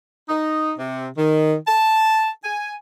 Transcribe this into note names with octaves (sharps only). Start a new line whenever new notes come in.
D#4
C3
D#3
A5
G#5